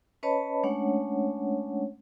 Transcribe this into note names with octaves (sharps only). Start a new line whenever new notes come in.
C#4 B4 C#5 D#5 A5 B5
G#3 A3 C#4 D4 C#5 F#5